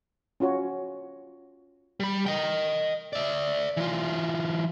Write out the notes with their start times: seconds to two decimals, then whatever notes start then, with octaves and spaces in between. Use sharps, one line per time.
0.40 C#4 F4 F#4 C#5
2.00 G3 B5
2.26 D#5 G5
3.13 D5 E5
3.77 E3 F4